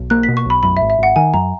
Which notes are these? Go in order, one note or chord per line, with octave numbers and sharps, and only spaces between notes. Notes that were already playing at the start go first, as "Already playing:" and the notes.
Already playing: B1
A#3 F#6
B2 B6
C#6
B1 B5
F#2 B5
E5
G#1
E5
G#1 F#5
D#3 G#5
F#2 A#5